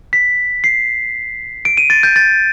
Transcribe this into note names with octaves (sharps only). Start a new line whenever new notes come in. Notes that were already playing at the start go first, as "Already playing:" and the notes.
B6
C7
D7
D#7
A6
G6
A6